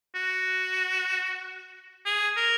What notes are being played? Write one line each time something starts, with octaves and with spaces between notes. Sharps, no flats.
F#4
G#4
A#4